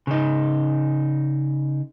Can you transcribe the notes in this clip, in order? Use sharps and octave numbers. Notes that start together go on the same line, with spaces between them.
C#3 D#4